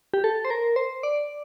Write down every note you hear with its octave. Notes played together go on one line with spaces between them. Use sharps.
G4
A4
C5
A#4
C5
D5